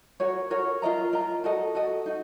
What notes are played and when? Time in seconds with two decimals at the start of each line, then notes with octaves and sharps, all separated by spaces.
0.20 F#4 A#4 C#5
0.50 F#4 A#4 C#5
0.82 F4 A#4 D#5 A#5
1.13 F4 A#4 D#5 A#5
1.44 F#4 A4 D#5
1.75 F#4 A4 D#5
2.06 D#4 F#4